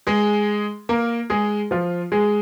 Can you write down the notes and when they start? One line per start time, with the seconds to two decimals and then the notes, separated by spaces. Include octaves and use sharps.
0.07 G#3 G#4
0.89 A#3 A#4
1.30 G#3 G#4
1.71 F3 F4
2.12 G#3 G#4